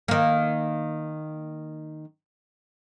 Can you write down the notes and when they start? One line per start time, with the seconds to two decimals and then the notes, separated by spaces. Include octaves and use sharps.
0.08 D#3 A#3